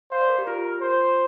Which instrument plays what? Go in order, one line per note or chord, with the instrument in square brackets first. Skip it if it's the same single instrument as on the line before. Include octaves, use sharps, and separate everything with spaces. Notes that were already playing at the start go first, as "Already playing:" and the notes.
[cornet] C5 [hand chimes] F5
[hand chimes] D5
A#4
G4
[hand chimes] F4 [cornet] A#4
[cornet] C5